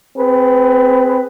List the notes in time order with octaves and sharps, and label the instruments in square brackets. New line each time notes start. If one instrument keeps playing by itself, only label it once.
[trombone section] C4 G#4 B4